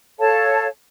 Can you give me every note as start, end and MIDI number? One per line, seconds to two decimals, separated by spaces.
0.19 0.67 69
0.19 0.67 73
0.19 0.67 77
0.19 0.67 81